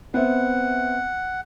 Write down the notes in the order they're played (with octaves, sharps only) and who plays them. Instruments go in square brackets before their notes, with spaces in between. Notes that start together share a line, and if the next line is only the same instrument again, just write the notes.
[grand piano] B3 C4 E5 [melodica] F#5